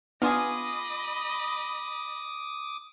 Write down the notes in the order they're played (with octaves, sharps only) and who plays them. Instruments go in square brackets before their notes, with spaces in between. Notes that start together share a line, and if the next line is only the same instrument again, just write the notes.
[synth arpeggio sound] B3 D4 [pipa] F4 G#4 [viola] D#5 B5 [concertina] D6 D#6